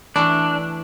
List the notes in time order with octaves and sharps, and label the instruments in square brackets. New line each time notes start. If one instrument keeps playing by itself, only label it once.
[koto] E3 A3 E4 [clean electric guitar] D4